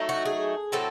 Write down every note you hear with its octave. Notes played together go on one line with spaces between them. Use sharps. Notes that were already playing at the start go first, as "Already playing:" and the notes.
Already playing: F#3 A3 D#4
F#4
G#4
A2 F#3 C4 A4